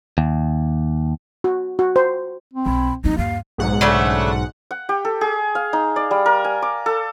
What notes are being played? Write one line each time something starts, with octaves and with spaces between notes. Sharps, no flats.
D#2
F#4
F#4
C5
C4
B1 B5
D#2 F3 C4 D#4
G2 F5
B1 G#2 F#5
C#3 A3 D4
F#5
G4
A4
G#4
F5
D#4
D5
G3
A#4
G#5
D6
A4